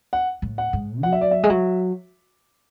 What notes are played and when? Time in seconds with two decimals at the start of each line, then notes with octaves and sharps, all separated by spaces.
0.13 F#5
0.42 A2
0.58 F#5
0.73 G#2
1.03 F#3 F#5
1.13 E5
1.21 D5
1.31 E5
1.43 G#3
1.50 F#3